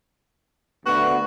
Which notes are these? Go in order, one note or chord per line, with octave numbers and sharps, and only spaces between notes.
D2 B3 F#4